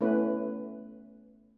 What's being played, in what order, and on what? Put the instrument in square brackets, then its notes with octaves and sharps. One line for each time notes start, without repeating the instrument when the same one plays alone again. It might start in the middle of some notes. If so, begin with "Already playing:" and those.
[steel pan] A3 B3 C#4 E4 B4